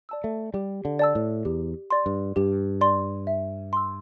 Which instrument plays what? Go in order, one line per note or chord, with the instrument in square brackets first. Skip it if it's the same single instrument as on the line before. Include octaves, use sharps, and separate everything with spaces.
[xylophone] D5 A5 E6
[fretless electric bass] A3
[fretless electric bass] G3 [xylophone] G4
[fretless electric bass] D3
[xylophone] D5 A5 E6
[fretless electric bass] A2
[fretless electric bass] E2 [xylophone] G4
[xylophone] D5 C6
[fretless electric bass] G2
[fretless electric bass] G2 [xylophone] G4
[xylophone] D5 C6
E5
C6 E6